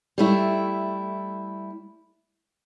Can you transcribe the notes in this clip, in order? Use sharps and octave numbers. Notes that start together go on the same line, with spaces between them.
G3 A3 E4